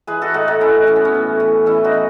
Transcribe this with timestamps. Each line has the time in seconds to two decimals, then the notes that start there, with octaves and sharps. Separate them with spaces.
0.07 E3 G#4 B4
0.22 F#4 A4
0.34 A2 D#4 F#4
0.48 D#4 F#4
0.61 E3 C#4 E4
0.87 E3 C#4
0.96 B3
1.05 C#4
1.14 A2
1.40 E3
1.66 E3 C#4 E4
1.84 D#4 F#4
1.93 E3